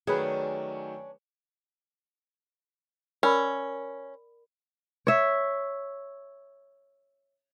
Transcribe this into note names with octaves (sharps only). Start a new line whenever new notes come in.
D#3 F#3 A3 C#4 D4 G#4 B4
C#4 A#4 D5 B5
C#5 E5